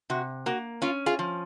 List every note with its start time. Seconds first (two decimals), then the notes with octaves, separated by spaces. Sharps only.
0.10 C3 F#4
0.46 A#3 F#4
0.82 C#4 F4
1.06 F4 G#4
1.19 F3